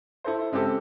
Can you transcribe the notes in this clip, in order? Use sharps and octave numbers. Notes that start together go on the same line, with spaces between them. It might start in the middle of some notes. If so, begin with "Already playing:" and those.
E4 A4 C5
C#3 G#3 C4 G4 A4